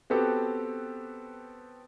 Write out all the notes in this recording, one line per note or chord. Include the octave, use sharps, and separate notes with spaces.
B3 C4 F#4 G4 A4